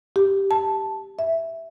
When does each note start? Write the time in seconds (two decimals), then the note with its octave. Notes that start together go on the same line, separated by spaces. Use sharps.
0.16 G4
0.51 A5
1.19 E5